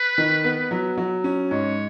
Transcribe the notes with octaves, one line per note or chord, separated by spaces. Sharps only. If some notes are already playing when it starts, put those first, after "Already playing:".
Already playing: B4
D#3
B3
F#3
F#3
C#4
G#2 C#5